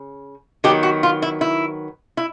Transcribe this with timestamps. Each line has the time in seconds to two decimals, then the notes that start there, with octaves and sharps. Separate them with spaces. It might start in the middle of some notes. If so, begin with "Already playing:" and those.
Already playing: C#3
0.64 D#3 F#3 B3 G4
0.83 F#4
1.03 F4
1.22 E4
1.41 E4
2.17 E4